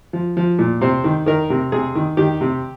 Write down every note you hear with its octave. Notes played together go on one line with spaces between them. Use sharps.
F3
F3
A#2
C3 C5
D#3
D#3 A#4
C3
C3 G#4
D#3
D#3 G4
C3